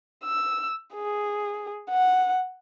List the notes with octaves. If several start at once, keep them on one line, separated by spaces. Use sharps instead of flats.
E6
G#4
F#5